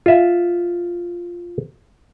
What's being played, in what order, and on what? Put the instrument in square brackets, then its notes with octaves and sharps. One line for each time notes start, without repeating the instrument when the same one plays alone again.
[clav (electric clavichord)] F4 E5